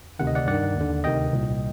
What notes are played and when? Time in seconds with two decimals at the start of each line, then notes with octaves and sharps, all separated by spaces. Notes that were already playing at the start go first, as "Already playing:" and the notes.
0.19 D2 C3 D#3 F#5
0.27 D#5
0.35 D5 F#5
0.47 G2 D#3 D5 F#5
0.76 D#2 D3
1.04 D2 C3 D#3 D#5 G5
1.32 C2 A#2